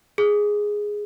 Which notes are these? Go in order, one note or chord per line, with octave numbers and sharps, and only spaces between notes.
G#4